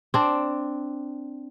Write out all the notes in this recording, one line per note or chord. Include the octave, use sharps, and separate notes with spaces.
C4 D4